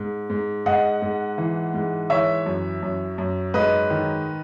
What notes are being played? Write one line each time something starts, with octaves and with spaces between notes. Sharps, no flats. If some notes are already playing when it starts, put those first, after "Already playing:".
Already playing: G#2
G#2
G#2 D#5 F#5
G#2
E3
G#2
E3 C#5 E5
F#2
F#2
F#2
G#2 B4 D#5
D#3